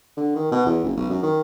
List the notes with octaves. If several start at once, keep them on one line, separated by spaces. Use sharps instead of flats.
D3
D#3
B2
E2
F#1
B1
F#2
D#3